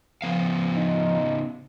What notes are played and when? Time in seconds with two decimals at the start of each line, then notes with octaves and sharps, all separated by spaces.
0.22 C#3 F3 B3 F5
0.76 D#4